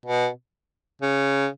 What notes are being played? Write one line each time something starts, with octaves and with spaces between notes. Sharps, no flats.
B2
C#3